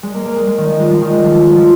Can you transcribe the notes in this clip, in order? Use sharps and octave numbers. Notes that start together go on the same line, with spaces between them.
G#3
A#3
A#3
G#3
G#3
D#3
F3
G#3
F3
D#3
G#3
F3
F3
G#3
F3